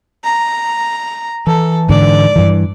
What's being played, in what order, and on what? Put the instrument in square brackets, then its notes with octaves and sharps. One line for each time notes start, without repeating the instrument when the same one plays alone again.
[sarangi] A#5
[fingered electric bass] E3 [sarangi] A4
[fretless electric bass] G#2 D3 [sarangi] D5
[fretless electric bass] G2 E3